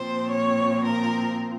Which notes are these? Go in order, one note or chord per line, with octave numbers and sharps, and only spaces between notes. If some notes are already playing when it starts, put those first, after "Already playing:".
Already playing: A#2 F3 C4 C5
C#5
A#4